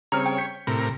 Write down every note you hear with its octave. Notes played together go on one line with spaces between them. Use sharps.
C#3 G3 C4 C#5 A#5 F6
G5
G6 B6 C#7
A2 C3 A#4 B5